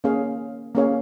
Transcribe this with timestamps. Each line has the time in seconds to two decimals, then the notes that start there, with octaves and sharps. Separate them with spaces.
0.04 A#3 C#4 G#4 C#5 F5
0.75 A#3 C#4 G#4 C#5 F5